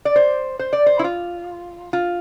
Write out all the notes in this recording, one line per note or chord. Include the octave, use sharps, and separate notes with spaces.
D5
C5
C5
D5
C5
E4
F4
F4